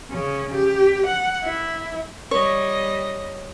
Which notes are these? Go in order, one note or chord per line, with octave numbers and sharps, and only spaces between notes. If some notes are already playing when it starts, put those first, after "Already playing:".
C#3 C#4
G4
F#5
E4
G3 C#5 D#5